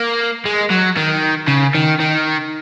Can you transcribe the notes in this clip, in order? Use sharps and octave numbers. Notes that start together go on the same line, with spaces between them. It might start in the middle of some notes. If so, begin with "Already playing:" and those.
Already playing: A#3
G#3
F#3
D#3
C#3
D#3
D#3